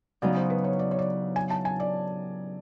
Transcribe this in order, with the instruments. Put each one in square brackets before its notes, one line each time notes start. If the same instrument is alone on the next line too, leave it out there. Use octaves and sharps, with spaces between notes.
[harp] C#3 F#3 B3 D#4 [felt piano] D5
[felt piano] C5
B4
C#5
D5
C#5
D5
G#5
A5
G#5
D5